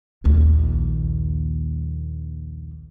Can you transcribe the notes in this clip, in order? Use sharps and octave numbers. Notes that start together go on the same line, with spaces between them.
A#1 D#2